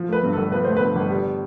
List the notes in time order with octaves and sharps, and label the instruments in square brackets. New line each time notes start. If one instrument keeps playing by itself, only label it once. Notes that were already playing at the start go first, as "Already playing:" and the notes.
Already playing: [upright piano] F3
A3 B4
G2
A4
G1
F3 B4
A3 C5
G2 B4
G1
G3